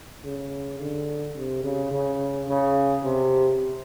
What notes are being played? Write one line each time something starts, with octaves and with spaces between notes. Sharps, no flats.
C#3
D3
C3
C#3
C#3
C#3
C3